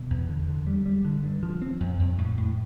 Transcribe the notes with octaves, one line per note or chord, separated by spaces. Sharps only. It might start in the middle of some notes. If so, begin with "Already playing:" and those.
Already playing: B2
E2
D3
D3
G3
G3
D3
G2
F3
C4
F2
F2
A2
A2